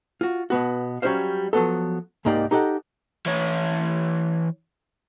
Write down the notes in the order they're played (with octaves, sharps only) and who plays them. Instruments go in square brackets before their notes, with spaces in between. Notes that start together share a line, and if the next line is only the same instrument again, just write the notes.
[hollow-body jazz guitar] F4 F#4
B2 B3 F#4
F#3 G3 C#4 F4 C5 F5
F3 F#3 B3 A4
C2 G#2 A#3 D#4 G4 D5
D#4 G4 A4 D#5 F#5
[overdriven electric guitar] E3 C#5